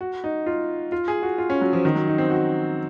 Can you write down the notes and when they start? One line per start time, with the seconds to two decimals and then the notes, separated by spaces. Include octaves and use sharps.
0.01 F#4
0.24 D#4
0.46 F4
0.92 F4
1.08 G#4
1.23 F#4
1.38 F4
1.50 C#4
1.61 F#3
1.73 F3
1.85 D#3
1.95 F#3
2.07 D#4
2.18 C4
2.30 F#4